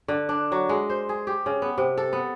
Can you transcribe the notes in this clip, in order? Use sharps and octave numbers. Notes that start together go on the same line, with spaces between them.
D3
D4
F#3
G#3
C5
G#4
G4
C#3
B3
C3
A4
B3